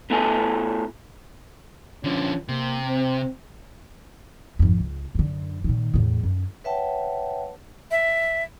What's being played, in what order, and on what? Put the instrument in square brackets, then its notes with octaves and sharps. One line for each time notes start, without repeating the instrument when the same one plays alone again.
[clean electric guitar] A2 B3 E4 A4 G#5 A5
[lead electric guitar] D3 F3 [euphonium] C#4
[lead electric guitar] C3 [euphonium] A#3
[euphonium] C4
[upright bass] G#1 F2
C#2
F#2 D3
A#2 D#3
E2 A2
F#2 C#4
[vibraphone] B4 C#5 E5 F#5 G5 A5
[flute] E5